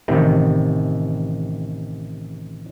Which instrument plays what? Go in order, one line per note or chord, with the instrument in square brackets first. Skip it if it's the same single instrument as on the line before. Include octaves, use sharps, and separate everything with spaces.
[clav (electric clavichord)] A1 C3 D#3